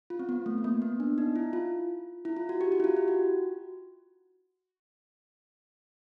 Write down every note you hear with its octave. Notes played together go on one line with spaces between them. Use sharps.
F4
C4
B3
A3
B3
A#3
B3
D4
D#4
E4
F4
E4
F4
F#4
G4
F#4
E4
F4
G4
F#4